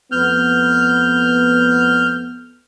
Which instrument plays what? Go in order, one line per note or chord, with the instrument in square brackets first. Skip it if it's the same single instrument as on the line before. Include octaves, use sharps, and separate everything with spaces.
[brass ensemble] F2 A3 B3 [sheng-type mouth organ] F6 G6